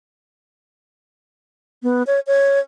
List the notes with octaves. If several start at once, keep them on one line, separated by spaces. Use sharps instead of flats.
B3
C#5
C#5